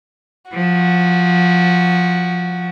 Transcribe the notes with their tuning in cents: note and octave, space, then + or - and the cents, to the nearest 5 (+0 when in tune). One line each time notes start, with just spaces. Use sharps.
F3 +15 F#4 +0